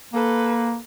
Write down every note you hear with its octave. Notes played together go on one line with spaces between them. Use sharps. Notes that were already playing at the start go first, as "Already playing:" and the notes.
A#3 A4 B4